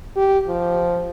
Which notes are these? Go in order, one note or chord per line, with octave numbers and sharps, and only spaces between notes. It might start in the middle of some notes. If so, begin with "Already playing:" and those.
G4
F3